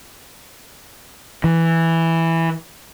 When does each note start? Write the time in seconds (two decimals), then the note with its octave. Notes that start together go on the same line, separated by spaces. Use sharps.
1.44 E3